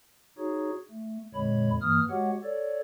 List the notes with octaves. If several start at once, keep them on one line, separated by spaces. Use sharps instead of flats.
D#4 F#4 G#4 C#5
A3
F2 A#2 D3 G#3 C#5 B5
G2 E3 A#3 D#6 F6
G#3 F#4 G4 C#5 F#5
A4 C#5 D5